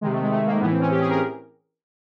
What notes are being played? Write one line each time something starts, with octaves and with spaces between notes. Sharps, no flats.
C3 D#3 G#3
A3
G#3
A3
A#3
A2 E3 B3
C4
C#4
G4
G#4
A#4